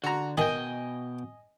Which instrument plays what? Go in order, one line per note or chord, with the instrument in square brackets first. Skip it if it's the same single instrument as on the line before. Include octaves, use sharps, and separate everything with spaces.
[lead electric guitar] D3 [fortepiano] F#4 A#5
[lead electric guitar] B2 G5 [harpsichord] D#3 [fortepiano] D#5 G#5